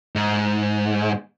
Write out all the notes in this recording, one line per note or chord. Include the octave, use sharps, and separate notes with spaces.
G#2